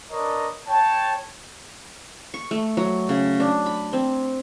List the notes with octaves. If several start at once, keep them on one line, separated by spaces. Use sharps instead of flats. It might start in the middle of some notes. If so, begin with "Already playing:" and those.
D4 A#4 B4 C#5 D#5
C#5 G5 A5
C#6
A3
F#3
C#3
D4
B5
C4